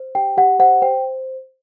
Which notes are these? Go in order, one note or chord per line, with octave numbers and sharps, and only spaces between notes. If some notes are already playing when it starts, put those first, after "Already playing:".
Already playing: C5
G4 G5
G4 F#5
C5 F#5
C5 G5